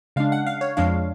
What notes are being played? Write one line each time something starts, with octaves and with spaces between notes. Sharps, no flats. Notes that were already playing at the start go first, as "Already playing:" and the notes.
C#3 G#3 D4 F5
F#5
F5
C#5
F2 F3 G#3 D4 F5